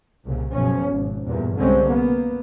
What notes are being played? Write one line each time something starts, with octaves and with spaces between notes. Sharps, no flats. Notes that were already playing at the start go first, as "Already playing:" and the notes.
C2 A#2 C#3
F#1 B2 F3 C#4
G#1
E2 G2 A#2
C2 D3 G3 G#3 C4 C#4
A#3 B3